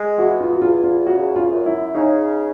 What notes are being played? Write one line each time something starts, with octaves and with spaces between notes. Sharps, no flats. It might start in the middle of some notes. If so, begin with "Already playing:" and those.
Already playing: G#3
E2 F#4
F4
F#4
E2 F4
F4
C#3 F#4
F4
F#2
E4
C#3 D#4